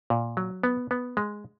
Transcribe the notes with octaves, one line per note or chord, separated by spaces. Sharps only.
A#2
F#3
B3
B3
G#3